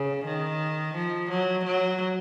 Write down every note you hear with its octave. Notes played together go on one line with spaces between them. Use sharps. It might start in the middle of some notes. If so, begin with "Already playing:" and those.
Already playing: C#3
D#3
F3
F#3
F#3